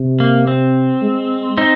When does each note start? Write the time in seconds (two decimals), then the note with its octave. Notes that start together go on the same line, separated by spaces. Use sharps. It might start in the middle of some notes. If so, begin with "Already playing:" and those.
Already playing: C3
0.20 A#3
0.47 C4
1.02 G#3
1.57 C4 D#4